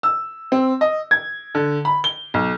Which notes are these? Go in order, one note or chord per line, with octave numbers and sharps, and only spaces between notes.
E6
C4
D#5
G#6
D3
B5
G7
B1